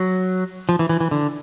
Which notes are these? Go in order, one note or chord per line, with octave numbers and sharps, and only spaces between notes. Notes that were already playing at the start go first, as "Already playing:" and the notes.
Already playing: F#3
F3
E3
E3
E3
D3